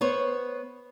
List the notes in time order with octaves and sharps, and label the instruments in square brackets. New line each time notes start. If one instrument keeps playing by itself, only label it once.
[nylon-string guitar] B3 C5 C#5